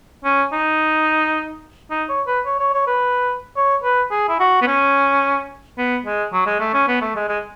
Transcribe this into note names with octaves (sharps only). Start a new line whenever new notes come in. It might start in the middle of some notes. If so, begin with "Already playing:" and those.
C#4
D#4
D#4
C#5
B4
C#5
C#5
C#5
B4
C#5
B4
G#4
E4
F#4
B3
C#4
B3
G#3
F#3
G#3
A3
C#4
B3
A3
G#3
G#3